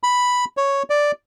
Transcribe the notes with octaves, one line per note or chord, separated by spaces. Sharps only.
B5
C#5
D5